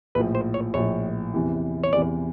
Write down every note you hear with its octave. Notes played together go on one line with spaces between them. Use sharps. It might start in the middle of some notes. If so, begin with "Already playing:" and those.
A#1 A2 F3 B4
C5
C#5
A#1 A2 F3 C#5
E2 C3 E3
C#5
E2 C3 E3 D5